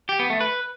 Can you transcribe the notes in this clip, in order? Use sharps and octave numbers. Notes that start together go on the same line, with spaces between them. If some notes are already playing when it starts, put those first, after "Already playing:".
G4
B3
A3
B4